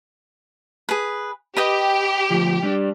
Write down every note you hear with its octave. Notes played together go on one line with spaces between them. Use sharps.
G#4 B4
G4 B4 D#5 G5
D2 F3
G3 D4